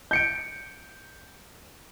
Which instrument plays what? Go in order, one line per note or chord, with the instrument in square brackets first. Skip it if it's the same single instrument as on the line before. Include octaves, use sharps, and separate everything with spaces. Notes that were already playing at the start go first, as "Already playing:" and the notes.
[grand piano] G6 C#7 D7